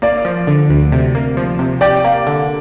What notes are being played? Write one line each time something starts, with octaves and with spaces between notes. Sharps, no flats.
A#3 D5
F3
D3
D2
C3
A#3
F3
C3
G4 D5
A#3
D3